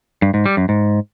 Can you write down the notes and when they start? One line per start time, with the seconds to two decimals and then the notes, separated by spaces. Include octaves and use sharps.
0.22 G2
0.34 G#2
0.46 G3
0.57 F#2
0.69 G#2